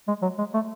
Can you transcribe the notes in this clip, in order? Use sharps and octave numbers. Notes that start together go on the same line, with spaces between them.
G#3
F#3
G#3
A3